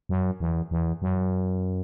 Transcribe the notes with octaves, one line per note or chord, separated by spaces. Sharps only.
F#2
E2
E2
F#2